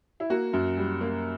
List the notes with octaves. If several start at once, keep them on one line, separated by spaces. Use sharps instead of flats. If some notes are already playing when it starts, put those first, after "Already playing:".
E4
A#3 F#4
F#2
G3
A#3